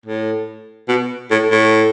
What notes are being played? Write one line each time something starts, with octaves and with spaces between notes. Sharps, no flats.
A2
B2
A2
A2